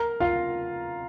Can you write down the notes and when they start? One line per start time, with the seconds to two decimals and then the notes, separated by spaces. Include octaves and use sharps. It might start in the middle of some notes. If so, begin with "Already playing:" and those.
Already playing: A#4 A#5
0.20 F4 F5